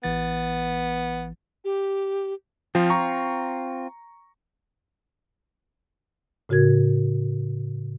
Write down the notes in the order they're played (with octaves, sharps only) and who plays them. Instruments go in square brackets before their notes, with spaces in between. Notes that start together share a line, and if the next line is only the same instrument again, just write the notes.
[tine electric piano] A1 E3 A6 [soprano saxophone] B3
[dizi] G4
[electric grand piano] F3 [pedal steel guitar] C4 F4
[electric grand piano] A#5 C#6
[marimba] A2 C#3 F#4 A#4 G#6